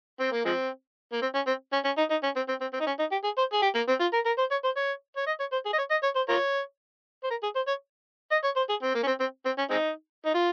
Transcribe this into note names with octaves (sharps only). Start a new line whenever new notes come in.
C4
A#3
F3 G#3 C4
A#3
C4
C#4
C4
C#4
C#4
D#4
D#4
C#4
C4
C4
C4
C4
D#4
C#4
D#4
G4
G#4
C5
G#4
G4
A#3
C4
F4
A#4
A#4
C5
C#5
C5
C#5
C#5
D#5
C#5
C5
G#4
D#5
C#5
D#5
C#5
C5
F4 A#4 C#5
C5
A#4
G#4
C5
C#5
D#5
C#5
C5
G#4
C4
A#3
C#4
C4
C4
C4
C#4
G#3 C4 D#4
D#4
F4